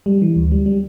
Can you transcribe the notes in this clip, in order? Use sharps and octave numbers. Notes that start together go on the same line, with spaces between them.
G3
E3
D2
G3
G3